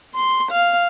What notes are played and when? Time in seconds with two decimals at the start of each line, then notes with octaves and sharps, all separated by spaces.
0.15 C6
0.52 F5